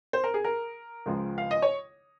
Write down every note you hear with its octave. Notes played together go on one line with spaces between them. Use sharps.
C5
A#4
G#4
A#4
C#2 C#3 F3 G#3
F5
D#5
C#5